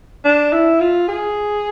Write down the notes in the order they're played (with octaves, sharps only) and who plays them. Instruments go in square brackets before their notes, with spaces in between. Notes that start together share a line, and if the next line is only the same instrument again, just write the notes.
[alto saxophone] D4
E4
F4
G#4